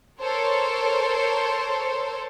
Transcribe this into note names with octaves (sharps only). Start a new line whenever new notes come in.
A4 A#4 C5 C#5